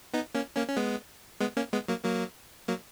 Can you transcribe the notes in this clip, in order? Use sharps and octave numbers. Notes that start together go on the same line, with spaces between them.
B3 D#4
A#3 C#4
A#3 C#4
C#4
G#3 B3
G#3 B3
A#3 C#4
G#3 B3
F#3 A#3
F#3 A#3
F#3 A#3